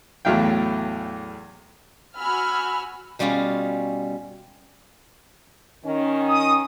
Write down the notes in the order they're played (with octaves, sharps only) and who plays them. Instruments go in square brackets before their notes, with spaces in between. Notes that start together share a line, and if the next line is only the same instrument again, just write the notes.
[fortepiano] E2 A2 F#3 E4 F5 G5
[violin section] F#4 G#5 B5 E6 F6
[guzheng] B2 G3 C#4 F4 G#4
[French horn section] D#3 C#4
[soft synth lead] D#6